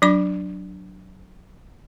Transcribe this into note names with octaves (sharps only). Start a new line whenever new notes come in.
F#3 D4 D6